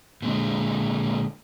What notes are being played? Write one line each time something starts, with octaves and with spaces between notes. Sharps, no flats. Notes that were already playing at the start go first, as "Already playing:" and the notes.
A#2 D3 G#3